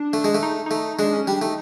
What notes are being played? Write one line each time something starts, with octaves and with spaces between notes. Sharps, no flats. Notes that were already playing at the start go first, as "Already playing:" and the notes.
Already playing: D4
A3
G#3
A3
D#4
A3 D#4
G#3 D4
C#4
G3 D4
A3 D#4